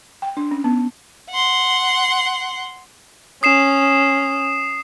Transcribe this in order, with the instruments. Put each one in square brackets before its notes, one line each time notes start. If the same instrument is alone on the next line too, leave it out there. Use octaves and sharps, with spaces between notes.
[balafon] G5
D4
C#4
B3
[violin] F#5 C6
[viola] C#4 [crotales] D#6 C7 E7